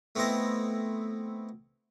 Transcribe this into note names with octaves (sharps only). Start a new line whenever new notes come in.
A3 B3 C4 E4 D#5